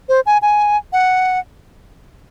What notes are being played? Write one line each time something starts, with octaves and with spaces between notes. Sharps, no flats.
C5
G#5
G#5
F#5